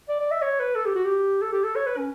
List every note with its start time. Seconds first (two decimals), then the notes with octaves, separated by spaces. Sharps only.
0.09 D5
0.20 D5
0.31 E5
0.42 C#5
0.59 B4
0.75 A4
0.85 G4
0.95 F#4
1.05 G4
1.41 A4
1.52 G4
1.63 A4
1.75 C#5
1.86 B4
1.98 C#4